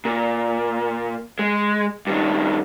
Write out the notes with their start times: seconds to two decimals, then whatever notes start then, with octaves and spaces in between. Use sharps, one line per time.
0.05 A#2
1.39 G#3
2.07 G2 D#3